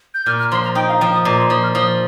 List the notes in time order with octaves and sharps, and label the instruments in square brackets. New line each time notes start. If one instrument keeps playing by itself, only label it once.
[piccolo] G6
[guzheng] A#2 [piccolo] F6
[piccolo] F6
[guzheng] F3 [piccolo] C6
[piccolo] A#5
[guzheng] D#4 [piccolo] G5
[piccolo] F5
[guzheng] F3 [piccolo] G5
[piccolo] D#6
[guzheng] A#2 [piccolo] A#5
[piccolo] C6
[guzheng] F3 [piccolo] D#6
[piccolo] F6
[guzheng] F3 [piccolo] D#6